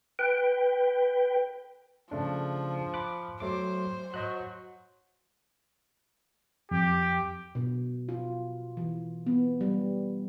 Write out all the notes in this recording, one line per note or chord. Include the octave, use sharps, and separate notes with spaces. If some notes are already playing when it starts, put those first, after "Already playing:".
B4 G5
C#3 F3 A3 D4
B5 D6 F#6
F#3 A3 C5 D6
F#3 C5 D#5 F#6
F2 G4
B2
F4
E3
B3
G3